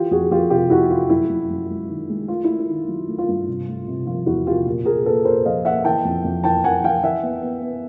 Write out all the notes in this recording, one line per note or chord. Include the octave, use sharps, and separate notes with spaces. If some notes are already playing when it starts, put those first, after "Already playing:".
Already playing: E3 F4 G4
F2 F#4 G#4
F2 F4 G4
C3 F4 G4
F2 E4 F#4
E3 F4
F#2 E4
F#2
F#2
G#3
D#3
G#3
A3 F4
A3 E4
E4
D#3
F#3
A3
F4
G2
C3
A3
C3
F3 F4
E2 E4 F#4
C3 F4 G4
A#2
A#2 G#4 A#4
A#3 A4 B4
A#2 A#4 C5
F3 D#5 F5
A#3 E5 F#5
E3 G5 A5
F2
F2
E3 G5 A5
F2 F#5 G#5
E3 F5 G5
E3 E5 F#5
B3
B3
B3